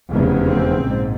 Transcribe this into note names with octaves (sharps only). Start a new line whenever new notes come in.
F1 E2 C#3
C4
A#1 G#2